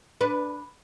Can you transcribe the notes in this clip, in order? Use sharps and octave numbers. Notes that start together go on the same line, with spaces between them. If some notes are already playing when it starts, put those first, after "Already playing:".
D4 B4